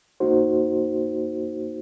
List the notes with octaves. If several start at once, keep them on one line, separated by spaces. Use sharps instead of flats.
A#3 D#4 F#4 C5